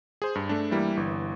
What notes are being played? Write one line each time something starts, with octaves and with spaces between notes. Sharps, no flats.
G#4 C5
G2
A3 D4
E3 G3 A#3 E4
G1 E3